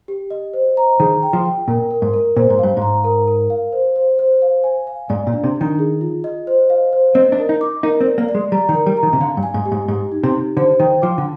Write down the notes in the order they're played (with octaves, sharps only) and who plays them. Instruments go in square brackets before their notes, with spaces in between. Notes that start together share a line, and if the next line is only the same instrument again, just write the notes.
[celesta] G4
D#5
C5
A#5
[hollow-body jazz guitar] D#3 [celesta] G#4
[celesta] G5
[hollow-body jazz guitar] F3
[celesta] G5
[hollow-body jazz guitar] A#2 [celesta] A#4
[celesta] A#4
[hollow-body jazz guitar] G#2
[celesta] A#4
[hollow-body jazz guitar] A#2 [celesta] C5
[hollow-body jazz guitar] G#2
[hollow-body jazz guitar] G2 [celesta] F5
[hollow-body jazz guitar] G#2 [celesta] A#5
[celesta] A#4
A#4
F5
C5
C5
C5
F5
G#5
F5
[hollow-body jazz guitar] G#2 [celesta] D5
[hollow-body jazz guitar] A#2
[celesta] D4
[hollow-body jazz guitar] C3
[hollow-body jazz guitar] D#3 [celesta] D4
[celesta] G#4
F4
D#5
C5
F5
C5
[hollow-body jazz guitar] C4 [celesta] D#5
[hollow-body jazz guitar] D4
[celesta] A#4
[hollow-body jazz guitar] D#4
[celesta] D6
[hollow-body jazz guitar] D#4 [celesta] A#4
[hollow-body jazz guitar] C4
[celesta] D5
[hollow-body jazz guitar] A#3
[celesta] D5
[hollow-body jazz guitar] G#3
[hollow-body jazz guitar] G3 [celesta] A#5
[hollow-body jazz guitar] D#3
[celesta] A#4
[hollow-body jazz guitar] G3
[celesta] A#5
[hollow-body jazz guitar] D#3
C3
[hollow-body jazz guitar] D3 [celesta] F5
[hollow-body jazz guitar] G2
[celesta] G#5
[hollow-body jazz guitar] G#2
[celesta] G4
[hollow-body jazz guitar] G#2
[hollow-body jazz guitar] G#2 [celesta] G4
[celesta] D#4
[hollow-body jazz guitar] C3
[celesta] G4
[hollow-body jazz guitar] D3 [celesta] C5
[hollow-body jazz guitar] D#3 [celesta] G5
[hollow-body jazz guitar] F3 [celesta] D6
[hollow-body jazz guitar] D3